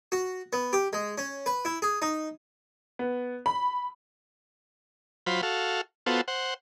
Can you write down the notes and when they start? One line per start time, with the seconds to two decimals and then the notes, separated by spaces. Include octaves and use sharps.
0.12 F#4
0.53 B3
0.73 G4
0.93 G#3
1.18 C#4
1.46 B4
1.65 E4
1.82 G#4
2.02 D#4
2.99 B3
3.46 B5
5.27 F#3 F4 C5 B5
5.43 F#4 A4 F5
6.06 B3 F4 F#4 A4 C5
6.28 C5 F#5